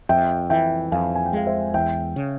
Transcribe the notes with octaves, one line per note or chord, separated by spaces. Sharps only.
F2 E5 G5
E3 E5 G5
F2 F5 G#5
G#5
G5
G#3 F5
C5 E5
E2 E5 G5
C#3